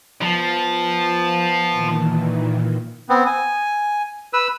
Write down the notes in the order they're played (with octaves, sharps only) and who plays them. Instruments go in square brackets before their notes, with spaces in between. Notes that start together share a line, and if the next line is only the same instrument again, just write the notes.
[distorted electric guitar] F3 [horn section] B3 A5
[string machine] A#2 D#3 E3
[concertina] B3 C4
G#5
B4 E6